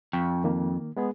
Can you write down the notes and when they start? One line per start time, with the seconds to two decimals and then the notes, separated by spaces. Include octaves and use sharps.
0.13 F2 G5 C#6
0.44 D#3 A#3
0.97 G#3 B3 G#4